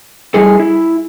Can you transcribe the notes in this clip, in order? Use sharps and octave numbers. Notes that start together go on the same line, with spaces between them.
G3 E4 G#4 A4
E4